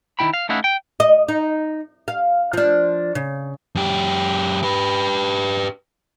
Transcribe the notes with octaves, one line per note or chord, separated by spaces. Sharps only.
D#3 A3 E4 G5 B5
F5
A3 C#4 D#4 E4 F5 F#5
G5
D#5
D#4
F5
F3 D4
C#3
F#2 G4
G4 B4